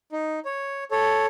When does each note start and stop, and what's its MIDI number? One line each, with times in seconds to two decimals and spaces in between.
0.12 0.39 63
0.45 0.84 73
0.91 1.26 69
0.91 1.26 73